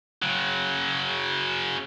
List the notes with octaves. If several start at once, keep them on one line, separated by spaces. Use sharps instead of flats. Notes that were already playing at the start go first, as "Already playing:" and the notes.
C#3 F#3